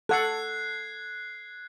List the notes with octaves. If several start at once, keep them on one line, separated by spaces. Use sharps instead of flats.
A4 F#5 F#6 G#6 C7